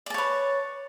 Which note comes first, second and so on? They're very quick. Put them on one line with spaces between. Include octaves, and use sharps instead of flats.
D5 A5 C#5 B4